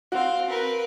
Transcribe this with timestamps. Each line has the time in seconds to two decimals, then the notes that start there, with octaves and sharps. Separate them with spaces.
0.12 C4 F#4 F5
0.49 A#4 B4